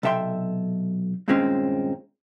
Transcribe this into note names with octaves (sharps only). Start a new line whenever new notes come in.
B1 C3 A4 E5 G5 C6
G2 A#2 D#3 G#3 C4 C#4